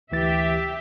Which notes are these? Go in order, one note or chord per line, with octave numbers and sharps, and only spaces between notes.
D2 E3 G4 E5 A6